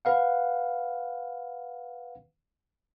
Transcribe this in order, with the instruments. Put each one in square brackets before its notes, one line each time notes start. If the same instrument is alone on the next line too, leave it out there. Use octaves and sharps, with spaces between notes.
[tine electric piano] B4 F5 F#5